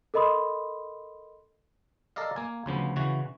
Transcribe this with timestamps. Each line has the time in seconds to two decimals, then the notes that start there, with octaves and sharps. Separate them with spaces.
0.14 A4 A#4 D#5 B5 C6 D#6
2.16 A4 A#4 D5 D#5 F5
2.36 A#3 G#5
2.66 D2 C#3 F3 B3
2.96 C#3 E3 F#4